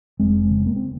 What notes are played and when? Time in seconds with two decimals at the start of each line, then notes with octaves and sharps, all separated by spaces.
0.19 F1 G#3 C4
0.51 C#3
0.66 A#3
0.76 C4